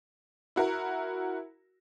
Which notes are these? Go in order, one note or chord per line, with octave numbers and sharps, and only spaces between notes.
E4 F#4 A#4